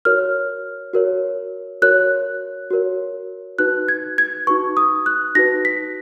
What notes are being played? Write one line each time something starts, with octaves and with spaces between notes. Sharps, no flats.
F#4 A#4 C#5 F6
F#4 A#4 C#5
F#4 A#4 C#5 F#6
F#4 A#4 C#5
D#4 F#4 B4 F#6
G#6
G#6
D#4 F#4 B4 C#6
D#6
F#6
D#4 F#4 B4 A#6
B6